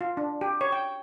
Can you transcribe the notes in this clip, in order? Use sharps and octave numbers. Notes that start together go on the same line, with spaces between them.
F4
D4
G4
C#5
G5